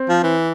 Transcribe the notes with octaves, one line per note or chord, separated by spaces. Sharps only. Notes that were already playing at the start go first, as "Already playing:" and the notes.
Already playing: C4
F3
E3